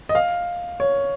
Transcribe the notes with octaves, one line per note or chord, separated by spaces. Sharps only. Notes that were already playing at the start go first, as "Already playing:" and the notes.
D#5
F5
C#5